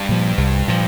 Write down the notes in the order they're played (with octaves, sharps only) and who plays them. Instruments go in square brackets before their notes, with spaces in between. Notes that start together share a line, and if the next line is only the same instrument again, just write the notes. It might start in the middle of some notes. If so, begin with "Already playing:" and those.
Already playing: [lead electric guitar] G2
[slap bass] A#2 F3
C2
A#2 F3